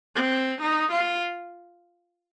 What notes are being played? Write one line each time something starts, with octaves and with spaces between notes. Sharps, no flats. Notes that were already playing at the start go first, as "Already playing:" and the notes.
C4
D#4
F4